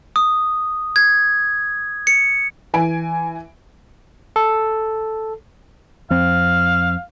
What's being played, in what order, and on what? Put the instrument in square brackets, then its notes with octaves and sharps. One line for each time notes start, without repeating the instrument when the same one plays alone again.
[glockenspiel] D#6
G#6
C#7
[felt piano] E3 G#5 D7
[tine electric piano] A4
[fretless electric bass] F2 C4 [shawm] F5